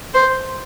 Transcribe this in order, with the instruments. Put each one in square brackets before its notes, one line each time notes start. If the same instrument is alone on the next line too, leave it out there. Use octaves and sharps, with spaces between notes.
[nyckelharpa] C5